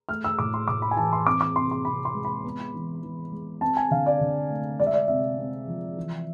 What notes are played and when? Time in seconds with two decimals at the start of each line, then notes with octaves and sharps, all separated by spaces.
0.09 A3 F6
0.24 E6
0.39 A2 D6
0.54 C6
0.68 A2 D6
0.82 B5
0.91 G#5
0.97 E3 A5
1.13 C6
1.26 C4 D6
1.41 D6
1.56 C3 C6
1.71 C6
1.85 C3 B5
2.05 C6
2.15 G#3
2.25 B5
2.44 B3
2.74 E3
3.03 E3
3.32 G#3
3.61 C4 A5
3.77 G#5
3.91 D3 F5
4.06 D5
4.21 D3
4.49 A3
4.80 G#3 D5
4.86 E5
4.94 D5
5.08 C3 E5
5.38 C4
5.68 F3
5.96 E3